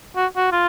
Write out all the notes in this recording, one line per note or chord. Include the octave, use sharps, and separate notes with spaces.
F#4
F#4
F4